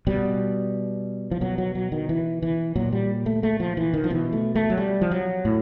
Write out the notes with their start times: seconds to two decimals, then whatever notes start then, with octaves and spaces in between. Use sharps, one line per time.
0.07 B2 G3
1.31 F3
1.41 B2 F#3
1.58 F#3
1.75 F#3
1.92 D#3
2.09 E3
2.42 E3
2.76 A#2 F#3
2.92 G3
3.26 A3
3.43 A3
3.60 F3
3.77 E3
3.94 D#3
4.04 F3
4.10 B2 E3
4.33 A3
4.55 A3
4.70 F#3
4.78 G3
5.01 F3
5.11 F#3
5.45 A2